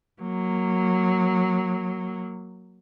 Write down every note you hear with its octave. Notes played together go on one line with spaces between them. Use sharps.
F#3 A#3